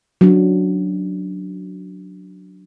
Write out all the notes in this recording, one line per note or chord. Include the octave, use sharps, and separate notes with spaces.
F#3 D4